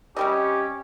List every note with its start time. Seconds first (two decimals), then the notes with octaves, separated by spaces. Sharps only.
0.17 C3 G3 C#4 G4 D#5